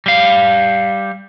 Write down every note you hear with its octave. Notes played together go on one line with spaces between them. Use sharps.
G3 F5